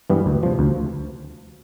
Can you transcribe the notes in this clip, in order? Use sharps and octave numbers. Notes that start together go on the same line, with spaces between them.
G2 E3 G3 B3
D2
C3 F3
D2